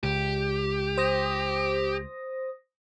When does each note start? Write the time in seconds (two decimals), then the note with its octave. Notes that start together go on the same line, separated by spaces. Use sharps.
0.04 C#2 G4
0.98 C5 D#6 A#6